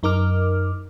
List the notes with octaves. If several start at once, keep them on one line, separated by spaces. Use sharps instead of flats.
F#2 D#4 A#4 D6 F6